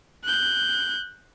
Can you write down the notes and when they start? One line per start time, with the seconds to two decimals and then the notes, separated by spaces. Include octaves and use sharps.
0.23 F#6 G6